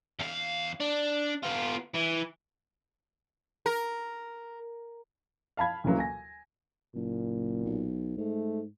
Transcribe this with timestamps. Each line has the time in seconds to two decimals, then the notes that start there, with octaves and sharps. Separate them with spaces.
0.19 E2 F5
0.81 D4
1.43 B3 F4
1.94 E3
3.66 A#4
5.57 F5 A5 B5 G#6
5.84 D2 C#3 E3 F#3 A#3
5.98 G#5 A#6
6.95 F#1 A#2
7.65 B1
8.17 G#2 A3